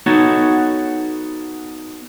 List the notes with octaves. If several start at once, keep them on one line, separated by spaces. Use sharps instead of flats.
B3 D#4 F#4 A4 C#5